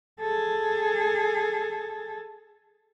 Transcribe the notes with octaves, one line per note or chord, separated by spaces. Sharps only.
G#4 A4